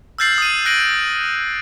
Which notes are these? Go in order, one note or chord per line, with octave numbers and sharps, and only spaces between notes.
E6 F6 G6 A6 C7 F#7
D#6 D#7
F#6 A#6 D7 D#7 F#7